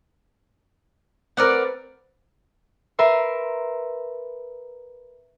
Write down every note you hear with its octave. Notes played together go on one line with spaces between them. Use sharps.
C4 A#4 B4 D5 F#5
A#4 B4 E5 C6